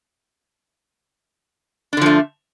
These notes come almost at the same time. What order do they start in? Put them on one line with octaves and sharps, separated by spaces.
D4 D3 F3 A3